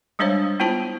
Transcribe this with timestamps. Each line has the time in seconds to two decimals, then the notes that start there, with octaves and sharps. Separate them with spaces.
0.19 G3 G#3 D4 C5 C#5 F5
0.60 B3 E4 F4 C5 A5